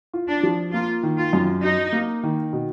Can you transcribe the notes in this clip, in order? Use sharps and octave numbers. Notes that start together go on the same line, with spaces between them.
F4
D4
F3
A#3 F4
D#3
F4
F#2
F#3 D#4
A#3
D#3
B2